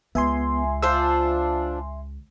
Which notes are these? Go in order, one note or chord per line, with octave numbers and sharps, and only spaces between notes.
C#2 B3 E5 G#5 C6
D4 F4 C5 E6